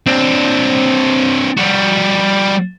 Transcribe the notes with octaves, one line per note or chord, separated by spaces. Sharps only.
C4 D4
G3 F#4